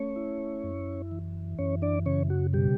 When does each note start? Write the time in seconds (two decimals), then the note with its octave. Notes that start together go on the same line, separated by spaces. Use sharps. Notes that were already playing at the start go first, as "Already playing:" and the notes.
Already playing: A3 C#4 C#5
0.16 E4
0.64 F#2
1.11 E3
1.58 F#2 C#4 C#5
1.82 D4 D5
2.06 C#3 C#4 C#5
2.30 F#4
2.53 B2 G3 G4